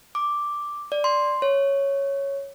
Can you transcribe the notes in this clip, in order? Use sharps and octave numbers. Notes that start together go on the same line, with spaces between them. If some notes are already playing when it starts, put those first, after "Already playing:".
D6
D5
C6
C#5